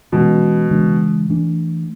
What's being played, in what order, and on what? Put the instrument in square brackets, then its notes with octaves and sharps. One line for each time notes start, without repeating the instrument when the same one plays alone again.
[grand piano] B2 [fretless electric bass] E3 G#3 C#4
[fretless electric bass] C#3 E3 G#3 D4
E3 A3 D4